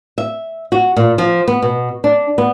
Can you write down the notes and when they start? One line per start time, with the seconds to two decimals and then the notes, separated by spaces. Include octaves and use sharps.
0.18 E5
0.72 F#4
0.97 A#2
1.18 F3
1.48 B3
1.62 B2
2.04 D4
2.38 B3